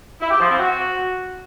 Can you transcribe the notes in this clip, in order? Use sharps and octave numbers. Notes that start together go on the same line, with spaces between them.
E4
G4
F3
C4
F#4